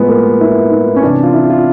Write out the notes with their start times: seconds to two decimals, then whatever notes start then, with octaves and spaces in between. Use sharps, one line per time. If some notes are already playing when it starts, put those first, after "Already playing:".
Already playing: A2 F3 G#3 B3
0.09 A#3
0.41 E4
0.72 E4
0.96 C#4
1.03 C3 E3 D4
1.23 F4
1.34 E4
1.50 F4